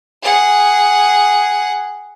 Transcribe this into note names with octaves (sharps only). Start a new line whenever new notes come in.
G#4 F#5